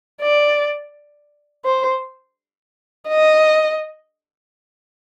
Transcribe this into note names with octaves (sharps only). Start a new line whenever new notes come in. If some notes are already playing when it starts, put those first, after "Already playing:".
D5
C5
D#5